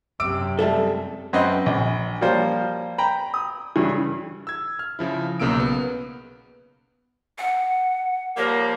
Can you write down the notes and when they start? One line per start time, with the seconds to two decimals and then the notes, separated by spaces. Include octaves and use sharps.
0.20 F#2 C3 D6 E6 D7
0.59 G3 G#3 A4 E5 A5
1.33 F#2 C4 B4 D#5 C6
1.66 A#1
2.21 F3 G3 A#3 F4 C5 C#5
2.98 G5 A#5 B5
3.34 D#6
3.76 G2 C#3 E3
4.47 E6 G#6
4.79 F6
4.99 C#3 F3 E4
5.40 B1 C#3 A#3 E6 D7
5.60 B3
7.38 F#5
8.37 F3 G3 A#3 C#5